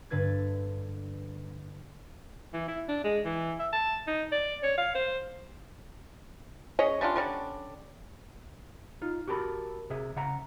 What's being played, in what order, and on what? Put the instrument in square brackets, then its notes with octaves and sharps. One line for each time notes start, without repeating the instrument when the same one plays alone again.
[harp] G2 D3 B4 G#6 A6
[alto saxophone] E3
E4
D4
G#3
E3
E5
A5
D#4
D5
C#5
F5
C5
[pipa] C#4 G#4 C#5 D#5
G3 C#4 D4 F4
D3 G3 C#4 D4
[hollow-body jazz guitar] D#4 F4
F#4 G4 A4 A#4 B5
C3 G#4 E5
C#3 E5 F#5 A#5